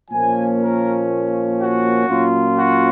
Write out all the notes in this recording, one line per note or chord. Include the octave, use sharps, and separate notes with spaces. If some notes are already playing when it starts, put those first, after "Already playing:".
A#2 F3 A#3 C#4 G#5
A#4
F#4
A#2 F#3 C#4 F4
F#4